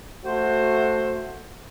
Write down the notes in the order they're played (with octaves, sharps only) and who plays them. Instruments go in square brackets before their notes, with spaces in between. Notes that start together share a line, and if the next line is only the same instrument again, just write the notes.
[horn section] A3 F#4 C5